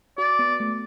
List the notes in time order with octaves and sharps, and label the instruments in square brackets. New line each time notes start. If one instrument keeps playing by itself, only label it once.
[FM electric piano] F#4 [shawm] D5
[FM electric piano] B3
A3